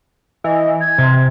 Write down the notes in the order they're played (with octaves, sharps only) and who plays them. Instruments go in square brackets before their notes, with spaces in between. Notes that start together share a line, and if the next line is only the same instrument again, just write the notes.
[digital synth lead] E3 [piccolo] D#5
[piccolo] G#6
[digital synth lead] C3